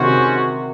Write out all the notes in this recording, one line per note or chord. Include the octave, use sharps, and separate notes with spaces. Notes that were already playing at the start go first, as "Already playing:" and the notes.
Already playing: C3 D#3 G#3 C#4 F#4 C5